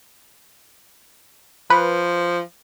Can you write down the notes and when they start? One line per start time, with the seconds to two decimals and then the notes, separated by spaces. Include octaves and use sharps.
1.70 F3 B4